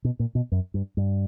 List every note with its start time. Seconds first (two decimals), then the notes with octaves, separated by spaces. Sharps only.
0.04 B2
0.19 A#2
0.35 B2
0.52 F#2
0.74 G2
0.97 G2